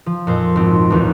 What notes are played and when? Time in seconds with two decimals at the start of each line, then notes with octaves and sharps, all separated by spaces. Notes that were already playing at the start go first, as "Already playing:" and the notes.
0.06 F3
0.27 F2 A#2 C5
0.56 G#1 C4
0.90 A1 D#2